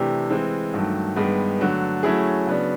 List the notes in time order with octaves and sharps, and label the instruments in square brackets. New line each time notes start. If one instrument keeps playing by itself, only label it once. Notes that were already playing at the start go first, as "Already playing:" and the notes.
Already playing: [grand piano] C3 E3 A3 D4 G4
E3 G#3 C4
G2 D#3 F#3 A3
G2 D#3 G#3 B3
D3 F#3 A3
F#3 A3 C#4 E4 G#4
C#3 F#3 B3 D4